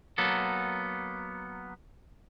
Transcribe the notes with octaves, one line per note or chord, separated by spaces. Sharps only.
F#3 A#3 B3 A4